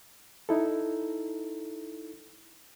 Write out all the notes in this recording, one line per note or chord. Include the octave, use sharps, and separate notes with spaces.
D#4 E4 A4